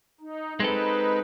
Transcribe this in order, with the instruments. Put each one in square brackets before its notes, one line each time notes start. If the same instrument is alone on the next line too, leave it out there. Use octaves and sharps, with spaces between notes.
[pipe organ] D#4
[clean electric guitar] G#3 C4 A4 [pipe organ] D#4 B4